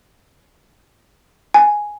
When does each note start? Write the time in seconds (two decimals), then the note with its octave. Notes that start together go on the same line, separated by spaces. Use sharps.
1.54 G#5